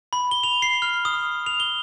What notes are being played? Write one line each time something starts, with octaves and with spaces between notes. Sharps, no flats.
B5
G7
F7
C7
F6
D#6
F7
G7